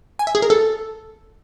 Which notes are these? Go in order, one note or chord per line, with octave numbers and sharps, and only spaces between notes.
G#5
E5
G#4
A#4
A4